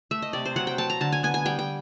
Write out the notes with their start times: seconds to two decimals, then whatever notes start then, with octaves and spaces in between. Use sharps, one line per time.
0.11 A3 E5
0.22 D#5
0.33 C3 D5
0.45 C5
0.56 F#3 F#5
0.67 G5
0.78 F#3 A5
0.90 A#5
1.01 D3 A5
1.12 G#5
1.23 B3 G#5
1.34 G#5
1.45 G3 G5
1.59 G5